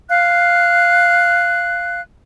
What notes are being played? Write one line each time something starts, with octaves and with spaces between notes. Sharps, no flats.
F5 F#6